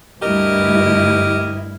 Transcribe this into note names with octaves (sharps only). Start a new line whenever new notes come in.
D2 G2 E4 G4 A#4 D#5